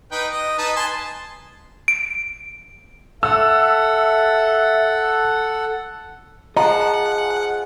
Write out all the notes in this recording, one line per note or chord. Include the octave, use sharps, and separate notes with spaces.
D#4 B4 G5
D#5
D#4 B4 A5
G#5 A5 C6
D7
A4 E5 F#5 E6
F3 G#4 D#5 F#5 A#5